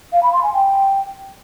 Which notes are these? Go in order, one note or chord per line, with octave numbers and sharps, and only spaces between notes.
F5
B5
C6
G#5
G5